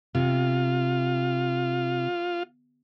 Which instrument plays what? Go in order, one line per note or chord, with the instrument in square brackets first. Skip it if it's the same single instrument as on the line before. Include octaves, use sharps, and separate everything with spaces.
[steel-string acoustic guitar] C3 [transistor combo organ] F4